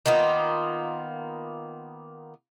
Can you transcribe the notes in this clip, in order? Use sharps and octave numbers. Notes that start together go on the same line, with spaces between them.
D#3 A#3 B3 F4